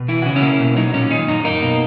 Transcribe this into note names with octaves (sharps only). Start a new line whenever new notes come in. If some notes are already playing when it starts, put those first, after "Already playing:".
Already playing: B2
E3 E4
C#3 F#4
C#4 E4
A#3
B2
F#3 D#4
A#2 C#4
D#3 D#4
F#2 D#4
A#3 D#4
B2